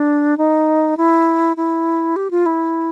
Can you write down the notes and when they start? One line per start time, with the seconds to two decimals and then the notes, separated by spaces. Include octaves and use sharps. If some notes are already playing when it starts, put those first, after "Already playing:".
Already playing: D4
0.38 D#4
0.97 E4
1.57 E4
2.16 G4
2.31 F4
2.46 E4